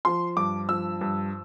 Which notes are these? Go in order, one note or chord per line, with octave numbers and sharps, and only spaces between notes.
F3 C6
G2 D6
F3 E6
G2